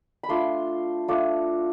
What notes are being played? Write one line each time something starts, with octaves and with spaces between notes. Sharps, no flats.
B5
A3 D4 F4 C6
A3 D4 F4